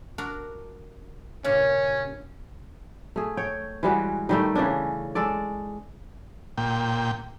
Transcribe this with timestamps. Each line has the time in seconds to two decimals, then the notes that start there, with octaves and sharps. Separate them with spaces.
0.18 D4 F#4 A#4
1.44 G2 A#2 C#3 C#4 C#5
3.16 A3 G#4
3.37 C#5 G5
3.83 E3 G3 G#3 F#4
4.29 D#3 G3 A3
4.55 C#3 E3 C#4 D4
5.15 G#3 A4 D5
6.58 A#2 G5